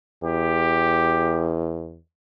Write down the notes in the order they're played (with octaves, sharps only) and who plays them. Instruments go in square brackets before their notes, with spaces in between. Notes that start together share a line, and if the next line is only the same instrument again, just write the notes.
[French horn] E2 [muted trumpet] G4